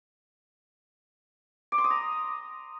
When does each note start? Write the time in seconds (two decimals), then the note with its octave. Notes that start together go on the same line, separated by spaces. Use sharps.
1.72 D6
1.78 C6
1.84 D#6
1.90 A#5